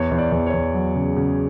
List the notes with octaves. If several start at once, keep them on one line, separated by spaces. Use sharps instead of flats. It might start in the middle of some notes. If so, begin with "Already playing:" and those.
Already playing: E2 C#5
E2
D5
E2
C#5
E2
F#3
C#3
C#3